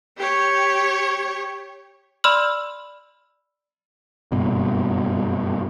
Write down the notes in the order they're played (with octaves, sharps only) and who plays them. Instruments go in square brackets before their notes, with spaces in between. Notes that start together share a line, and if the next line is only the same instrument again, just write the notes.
[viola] G4 C#5
[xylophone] D5 B5 C6 E6 F6 F#7
[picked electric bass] F#1 G2 B2